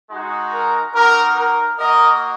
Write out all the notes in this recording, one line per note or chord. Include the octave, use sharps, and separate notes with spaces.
G#3 D#4 F#4
A#4
A#3 D#4 F#4 A#4
A#4
A#3 F#4 A#4 D#5